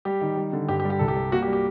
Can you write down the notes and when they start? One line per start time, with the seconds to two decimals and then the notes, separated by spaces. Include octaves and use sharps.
0.05 G3 G4
0.21 D#3
0.37 G3
0.53 D3
0.68 G2 G4
0.80 G4
0.85 G3
0.90 G4
0.99 C2 A4
1.08 G4
1.16 G3
1.32 A#3 F#4
1.42 G4
1.47 G3
1.53 G4